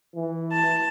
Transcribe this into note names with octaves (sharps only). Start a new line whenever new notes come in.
E3
A5